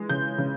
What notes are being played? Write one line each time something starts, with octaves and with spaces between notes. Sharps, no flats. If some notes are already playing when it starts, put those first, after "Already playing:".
Already playing: E3 G#3
C#3 G6
C#3